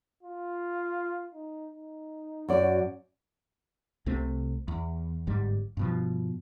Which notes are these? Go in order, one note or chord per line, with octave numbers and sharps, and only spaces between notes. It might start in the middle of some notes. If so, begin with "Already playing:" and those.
F4
D#4
D#4
F#2 F#4 D5
C2 C3 A3 C4
E2
G1 G#2 G3
G2 B2 F3